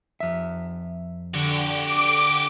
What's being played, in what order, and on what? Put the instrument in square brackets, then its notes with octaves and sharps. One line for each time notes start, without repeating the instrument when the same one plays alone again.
[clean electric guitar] F2 E5
[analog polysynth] D3 D7 [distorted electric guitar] F#4 G4
[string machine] D6